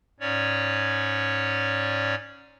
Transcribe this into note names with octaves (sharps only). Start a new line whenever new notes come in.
G#2 C#4 C#5 D5